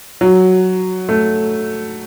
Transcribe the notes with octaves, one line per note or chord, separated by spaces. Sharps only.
F#3
A3